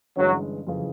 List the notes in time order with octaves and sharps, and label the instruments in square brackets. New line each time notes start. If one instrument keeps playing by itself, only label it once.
[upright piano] G1 G2 E3 G#3 C#4 [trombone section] F#3
[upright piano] F#1 F2 C#3 E3